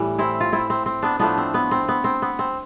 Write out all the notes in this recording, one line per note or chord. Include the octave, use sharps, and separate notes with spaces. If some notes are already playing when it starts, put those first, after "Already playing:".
Already playing: A2 E3 G3
C4 E4
F4
C4 E4
C4
C4
B3 D4
A2 F3 A3 B3 D4
C4
B3
C4
B3
C4
B3
C4